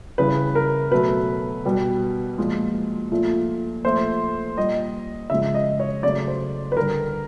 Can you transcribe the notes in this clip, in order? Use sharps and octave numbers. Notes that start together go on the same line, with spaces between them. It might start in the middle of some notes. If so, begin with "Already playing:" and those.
C#3 E3 G3 B4
A#4
B2 F#3 A3 B4
B2 G3
A#2 F3 G#3
A#2 F3 A3
A#2 F3 A3 C5
A#2 G3 D#5
C#3 F3 G#3 E5
D#5
C#5
C#3 F#3 A3 D5
C5
B4
D3 G3 A#4